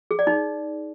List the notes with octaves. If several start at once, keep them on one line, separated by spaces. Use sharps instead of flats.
G#4
D5
D#4